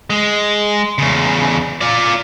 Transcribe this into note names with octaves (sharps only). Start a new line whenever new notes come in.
G#3
E2 C#3
F4 D5